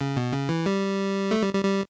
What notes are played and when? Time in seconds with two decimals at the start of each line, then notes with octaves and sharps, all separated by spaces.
0.01 C#3
0.16 B2
0.32 C#3
0.49 E3
0.66 G3
1.31 A3
1.42 G3
1.54 G3
1.65 G3